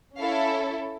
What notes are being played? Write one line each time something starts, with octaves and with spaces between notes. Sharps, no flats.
C#4 E4 A4 F5